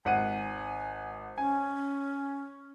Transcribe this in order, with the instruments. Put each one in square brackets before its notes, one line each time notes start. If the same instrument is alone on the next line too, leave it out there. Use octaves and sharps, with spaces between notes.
[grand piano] G#1 F#5 D#7 [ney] G#5
[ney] C#4 [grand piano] G#5